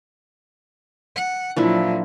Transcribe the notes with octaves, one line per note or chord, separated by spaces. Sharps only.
F#5
A#2 F3 F#3 D4 E4